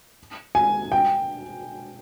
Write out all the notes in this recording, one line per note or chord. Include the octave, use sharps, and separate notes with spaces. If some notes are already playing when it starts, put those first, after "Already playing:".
G#5
G5